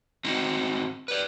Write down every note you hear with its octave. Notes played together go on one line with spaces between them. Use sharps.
C4 D#4 F#4
B4 D5